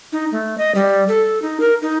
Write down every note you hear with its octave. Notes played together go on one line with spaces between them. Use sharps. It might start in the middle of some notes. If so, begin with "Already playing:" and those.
D#4
A3
D#5
G3
A4
D#4
A#4
D#4